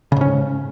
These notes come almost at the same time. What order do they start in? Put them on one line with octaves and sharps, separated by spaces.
C#3 G#2 C#4